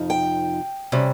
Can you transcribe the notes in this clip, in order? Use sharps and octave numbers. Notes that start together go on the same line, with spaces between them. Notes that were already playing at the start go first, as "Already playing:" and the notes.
Already playing: F2 C3 F3 D#4
G5
C3 G3 C#4